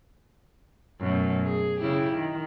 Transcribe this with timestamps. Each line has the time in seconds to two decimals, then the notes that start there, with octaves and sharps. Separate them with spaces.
1.01 F#2 B2 A3
1.43 G#4
1.81 C#3 E4 G4
2.13 D#3